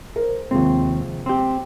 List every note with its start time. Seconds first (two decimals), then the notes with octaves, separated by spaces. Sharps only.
0.16 A#4 C5
0.51 D#2 C3 F3 G#3 C4
1.26 C4 G4